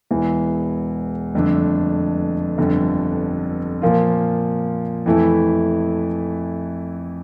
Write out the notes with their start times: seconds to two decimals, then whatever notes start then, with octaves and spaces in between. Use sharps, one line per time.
0.11 E1 E2 E3
1.34 G1 F2 D3 A3 D4
2.58 G1 F2 D3
3.82 A#2 F3 A#3 F4
5.06 F2 E3 A3 E4